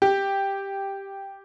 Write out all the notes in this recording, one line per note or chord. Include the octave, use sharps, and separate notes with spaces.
G4